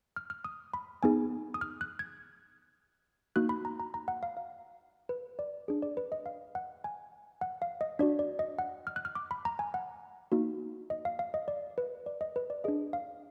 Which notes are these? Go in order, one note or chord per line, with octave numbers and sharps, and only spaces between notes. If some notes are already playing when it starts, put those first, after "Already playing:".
F6
F6
D#6
B5
B3 D#4 G#4 G#5
D#6
F6
F#6
G#6
A#3 D#4 F#4 F#6
B5
A#5
A#5
A#5
F#5
F5
F5
B4
D5
D4 G#4
D5
B4
D#5
F5
F#5
G#5
F#5
F5
D#5
D4 F#4 D5
D5
D#5
F#5
F6
F#6
F6
D6
B5
A#5
G#5
F#5
A#3 D#4 F#4
D#5
F5
F5
D#5
D5
B4
D5
D#5
B4
D5
D4 G#4 D#5
F5